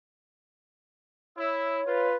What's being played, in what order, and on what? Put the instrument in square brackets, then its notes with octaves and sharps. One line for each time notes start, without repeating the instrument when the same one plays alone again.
[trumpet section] E4 [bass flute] C#5 [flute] E6
[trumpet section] F4 [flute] B4